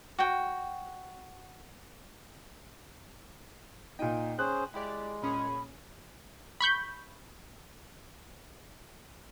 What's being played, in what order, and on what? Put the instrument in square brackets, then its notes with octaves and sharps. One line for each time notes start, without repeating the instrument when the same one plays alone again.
[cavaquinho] F#4 G5
[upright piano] A#2 D#4 [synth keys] G5 D#7
[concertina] C#4 G#4 C5 [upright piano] F#6
[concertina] G#3 [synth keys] E4 G4 D5
[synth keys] A#2 C#4 G#4 [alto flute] B5
[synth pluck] B5 C#6 G6